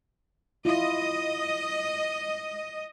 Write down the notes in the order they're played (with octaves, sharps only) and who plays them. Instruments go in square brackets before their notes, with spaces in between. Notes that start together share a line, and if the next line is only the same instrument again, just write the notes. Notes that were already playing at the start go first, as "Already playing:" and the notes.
[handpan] E4 F4 [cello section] D#5